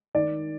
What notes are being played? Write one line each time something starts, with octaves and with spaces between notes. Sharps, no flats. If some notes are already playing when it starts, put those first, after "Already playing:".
D#3 D5